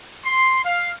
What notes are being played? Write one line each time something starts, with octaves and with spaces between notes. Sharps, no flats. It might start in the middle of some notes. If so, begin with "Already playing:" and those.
C6
F5